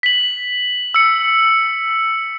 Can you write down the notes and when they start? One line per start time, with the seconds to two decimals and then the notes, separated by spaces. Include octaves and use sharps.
0.03 B6 F#7
0.94 E6 C#7